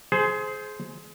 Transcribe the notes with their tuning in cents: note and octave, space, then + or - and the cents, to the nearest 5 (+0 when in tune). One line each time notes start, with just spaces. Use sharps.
G#4 +25 C5 -5